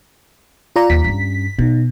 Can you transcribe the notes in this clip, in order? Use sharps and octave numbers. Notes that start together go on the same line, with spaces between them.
F4 D5 A#5
D#2 B6
G2 C#4
B2 D#4